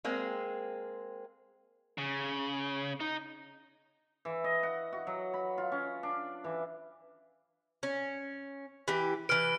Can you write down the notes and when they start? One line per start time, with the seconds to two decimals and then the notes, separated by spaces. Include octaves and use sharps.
0.05 G#3 A#3 C4
1.98 C#3
3.00 D#4
4.25 E3
4.44 D#5
4.63 F#5
4.93 F#4
5.07 F#3
5.34 B5
5.58 F4
5.72 C#4
6.03 D4
6.44 E3
7.83 C#4
8.88 E3 G4
9.29 E3 B4 F6 D7